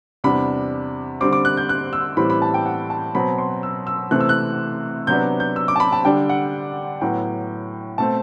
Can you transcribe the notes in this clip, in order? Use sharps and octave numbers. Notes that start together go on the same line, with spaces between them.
E2 C3 G3 D4 B5
D3 G3 C4 D6
D6
F#6
G6
F#6
E6
A2 E3 G3 C4 B5
B5
A5
G5
F#5
A5
B2 F#3 C4 B5
C6
E6
E6
C3 E3 A3 C4 F#6
E6
F#6
C3 F#3 B3 D4 G6
G6
E6
D6
A5
B5
A5
D3 G3 D4 G5
F#5
A2 F#3 B3 G5
B2 A3 C4 A5